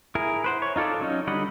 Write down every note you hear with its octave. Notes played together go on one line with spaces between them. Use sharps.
E4 G#4 A#4
B4 C5 F#5
C#5
D#4 F4 A4 D5
F#3 C#4 D#4
D3 G3 D#5 F#5 B5